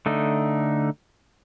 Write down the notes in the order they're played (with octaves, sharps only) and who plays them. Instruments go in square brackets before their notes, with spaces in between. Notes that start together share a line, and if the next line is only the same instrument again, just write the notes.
[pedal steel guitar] D3 A3 D#4